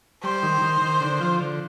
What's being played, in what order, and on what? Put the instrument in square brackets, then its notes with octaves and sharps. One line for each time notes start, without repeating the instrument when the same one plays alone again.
[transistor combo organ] G3 [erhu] C5
[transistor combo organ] D#3
D#3
D#3
D3
F3
D3